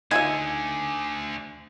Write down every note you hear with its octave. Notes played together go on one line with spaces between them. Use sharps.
D2 D3 D#4 F4 E5 G#5